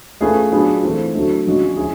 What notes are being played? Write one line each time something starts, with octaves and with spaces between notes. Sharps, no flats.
A3 C#4 F4 G#4 B4
F#3 B3 D4 F4 G#4
E3 A3 C4 F4
D3 F#3 A3
D3 F3 G#3 C#4 F#4
C#4 E4 G#4